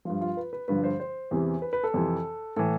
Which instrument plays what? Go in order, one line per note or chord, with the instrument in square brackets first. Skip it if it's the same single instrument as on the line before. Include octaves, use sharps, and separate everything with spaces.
[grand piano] G2 F3 F4
F4
B4
B4
G2 D3 F3 B4
C5
C5
E2 C3 E3
B4
B4
A4
F2 C3 E3
A2 E3 A4